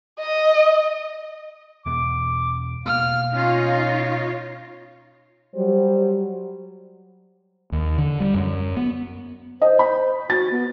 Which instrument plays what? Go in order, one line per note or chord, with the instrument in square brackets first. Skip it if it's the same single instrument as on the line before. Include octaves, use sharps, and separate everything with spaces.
[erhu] D#5
[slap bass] E2 B2 B3 [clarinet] D6
[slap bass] B2 A#3 B3 [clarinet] F5 [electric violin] F6
[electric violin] C#4 [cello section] D#4 F4 C#5
[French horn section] F#3 G3 C5
[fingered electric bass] D#2
D3
G3
F#2
B3
[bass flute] C5 [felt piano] D#5
[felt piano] B5
[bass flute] F#4 [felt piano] A6
[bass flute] B3